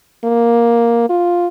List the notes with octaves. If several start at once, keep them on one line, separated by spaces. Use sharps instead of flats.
A#3
F4